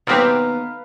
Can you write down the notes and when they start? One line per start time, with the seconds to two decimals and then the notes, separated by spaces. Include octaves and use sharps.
0.07 D#2 B2 B3 C4 G4 B4 F5 A#5